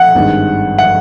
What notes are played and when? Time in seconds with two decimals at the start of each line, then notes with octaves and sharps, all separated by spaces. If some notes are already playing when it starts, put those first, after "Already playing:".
Already playing: F#5
0.15 G#1 G2 D#3 G#3
0.78 F#5